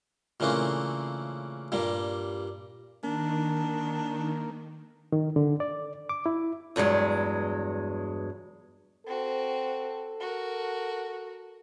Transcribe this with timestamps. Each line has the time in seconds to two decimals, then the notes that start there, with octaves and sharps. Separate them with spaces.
0.40 A#2 C#3 E3 A3 A#3 C4
1.72 G2 A#2 G3
3.04 D#3 A#3 D4
5.12 D#3
5.36 D3
5.60 D5
6.09 D6
6.26 E4
6.76 E2 G2 F#3 G#3
9.06 C4 F#4 A4
10.20 F#4 A#4